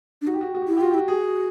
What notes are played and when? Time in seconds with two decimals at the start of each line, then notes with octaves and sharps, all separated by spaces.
0.22 D4
0.27 D#4 F#4
0.34 G4
0.41 F#4
0.47 G4
0.55 F#4
0.62 G4
0.68 E4 F#4
0.77 G4
0.81 F4 F#4
0.91 G4
0.94 E4
0.98 F#4
1.08 F#4 G#4